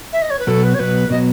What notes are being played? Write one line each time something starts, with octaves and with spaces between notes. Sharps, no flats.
E5
D#5
C#5
B4
B2 F#3 B3 A4
B4
C#5
B2 F#3 B3 B4
B2 F#3 B3 D#5